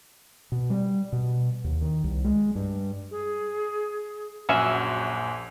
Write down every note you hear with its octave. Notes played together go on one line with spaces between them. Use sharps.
B2
G3
B2
D#2
D#3
C2
G#3
G2
G#4
A#1 F#2 C#4 F#4 E5 G#5